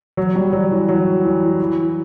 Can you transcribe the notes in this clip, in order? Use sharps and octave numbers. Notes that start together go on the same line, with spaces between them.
F#3
G3
F#3
E3
F#3
E3
E3